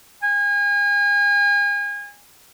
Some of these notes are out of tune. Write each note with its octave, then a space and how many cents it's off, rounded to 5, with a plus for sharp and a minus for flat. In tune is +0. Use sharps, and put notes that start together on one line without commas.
G#5 -35